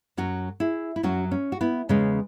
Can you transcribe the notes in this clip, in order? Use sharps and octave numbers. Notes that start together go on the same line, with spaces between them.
F#2 F#3 C#4 F#4
E4 G#4
E4
F#2 F#3 C#4 F#4
C#4
F#4
B3 E4
E2 C#3 G#3 C#4